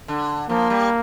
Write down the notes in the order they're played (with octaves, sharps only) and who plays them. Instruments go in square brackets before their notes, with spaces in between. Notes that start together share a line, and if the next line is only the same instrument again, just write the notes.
[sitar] D3
[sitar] F3 [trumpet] A#3
[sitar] G3